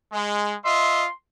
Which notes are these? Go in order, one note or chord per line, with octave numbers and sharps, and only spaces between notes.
G#3
F4 D#5 E5 C6